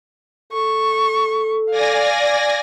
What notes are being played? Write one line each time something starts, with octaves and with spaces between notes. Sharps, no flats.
A4 C#6
D5 F5 G#5 A#6